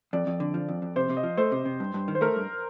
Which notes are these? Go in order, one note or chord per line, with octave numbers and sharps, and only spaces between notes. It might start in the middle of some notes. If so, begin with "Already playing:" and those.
F2 D5
F2
D3
F3
F2
F2
C3 C5
C3
D#5
F3
A3 C5
C3
C3
G2
G2
D#3
C5
A3 A#4
G2